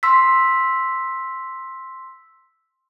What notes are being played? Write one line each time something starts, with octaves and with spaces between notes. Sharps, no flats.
C6 E6 B6